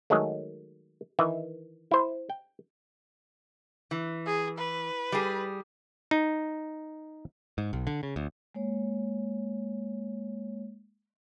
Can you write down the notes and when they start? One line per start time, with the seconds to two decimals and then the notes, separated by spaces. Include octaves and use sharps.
0.10 D#3 F#3 G#3 A3
1.19 D#3 E3 E5
1.91 E4 C5
2.30 G5
3.91 E3
4.26 G#4
4.58 B4
5.12 G3 G#4
6.11 D#4
7.58 G#2
7.73 B1
7.87 D3
8.03 C#3
8.16 D2
8.55 G#3 A#3 C#5